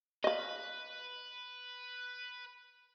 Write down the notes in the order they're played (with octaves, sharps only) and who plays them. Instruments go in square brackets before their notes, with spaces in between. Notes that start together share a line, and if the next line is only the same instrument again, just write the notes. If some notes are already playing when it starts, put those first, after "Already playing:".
[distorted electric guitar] B4 [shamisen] D#5 F5